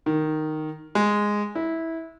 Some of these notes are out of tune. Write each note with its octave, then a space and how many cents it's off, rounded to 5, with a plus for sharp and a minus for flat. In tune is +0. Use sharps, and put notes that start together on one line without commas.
D#3 -5
G#3 -5
E4 -15